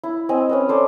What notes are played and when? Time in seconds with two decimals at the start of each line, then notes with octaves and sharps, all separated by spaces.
0.04 E4
0.29 C4 D#5 G#5
0.49 C#4 B4 D#5
0.69 A4 C5 D5